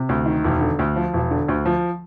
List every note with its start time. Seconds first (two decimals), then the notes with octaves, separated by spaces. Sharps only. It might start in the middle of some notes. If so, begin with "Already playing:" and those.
Already playing: C3
0.09 D2
0.26 D#3
0.44 E1
0.61 D3
0.79 D2
0.96 F3
1.14 E1
1.31 D3
1.48 D2
1.66 F3